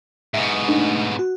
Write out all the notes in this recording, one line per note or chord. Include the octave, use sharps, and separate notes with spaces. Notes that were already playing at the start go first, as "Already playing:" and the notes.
G#2 B2 E5
A3 D4 D#4
F#4